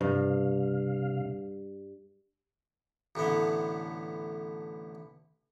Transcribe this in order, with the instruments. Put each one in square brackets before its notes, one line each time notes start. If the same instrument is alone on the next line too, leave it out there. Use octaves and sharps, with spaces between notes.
[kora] G2 [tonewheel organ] C3 F5
[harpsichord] A1 A2 D3 B3